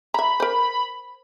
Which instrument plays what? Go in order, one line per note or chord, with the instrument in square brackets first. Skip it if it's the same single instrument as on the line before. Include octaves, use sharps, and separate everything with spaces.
[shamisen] E5 A#5 [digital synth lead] B5
[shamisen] A#4 C5